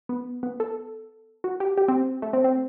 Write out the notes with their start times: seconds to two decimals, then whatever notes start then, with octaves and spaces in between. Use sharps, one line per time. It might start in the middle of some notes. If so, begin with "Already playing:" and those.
0.09 B3
0.43 B3
0.60 A4
1.44 F#4
1.60 G4
1.78 G4
1.88 C4
2.22 A3
2.33 C4
2.44 C4